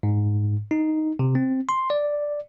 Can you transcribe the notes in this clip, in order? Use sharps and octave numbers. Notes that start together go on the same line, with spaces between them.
G#2
D#4
C3
C4
C6
D5